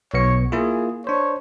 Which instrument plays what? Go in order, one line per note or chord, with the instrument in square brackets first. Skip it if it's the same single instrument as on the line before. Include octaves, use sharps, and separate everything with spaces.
[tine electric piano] B1 B3 C#7 [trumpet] C#5
[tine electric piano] A#3 E4 F4 [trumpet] G#4
[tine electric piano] D4 C5 [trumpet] C#5